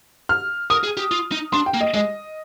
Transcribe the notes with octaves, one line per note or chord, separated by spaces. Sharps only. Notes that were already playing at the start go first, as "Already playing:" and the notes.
F6
A#4 D#6
G#4
G4
F4
D#4
D4 C6
G5
A#3
D#5
G#3 D#5